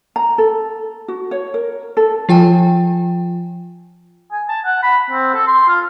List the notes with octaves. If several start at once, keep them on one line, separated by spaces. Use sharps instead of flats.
A#5
A4
F#4
C#5
A#4
A4
F3 F4 G5 G#5
G#5
A5
F#5
B5
C4
A4
C6
F4